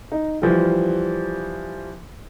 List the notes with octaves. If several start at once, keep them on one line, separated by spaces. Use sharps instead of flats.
D#4
E3 F3 G3